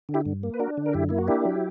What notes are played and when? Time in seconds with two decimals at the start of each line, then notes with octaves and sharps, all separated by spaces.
0.09 D3
0.14 E4 G4
0.26 G2
0.43 A#3
0.54 B4
0.59 D4 F#4 A#4
0.77 D3
0.86 A#4
0.93 F#2 E4 G4
1.09 A#3 E4
1.18 F#4
1.27 D4 E4 G4
1.45 F#3